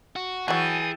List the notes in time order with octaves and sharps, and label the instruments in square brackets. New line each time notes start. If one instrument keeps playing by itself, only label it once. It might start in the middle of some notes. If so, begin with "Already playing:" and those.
[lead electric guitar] F#4
[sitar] E3 [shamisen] F#3 F#4 [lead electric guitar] G#4 [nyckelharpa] G5 A5